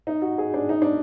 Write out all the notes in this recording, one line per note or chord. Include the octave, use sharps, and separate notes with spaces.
D#4
F#4
G#4
D4
D#4
D4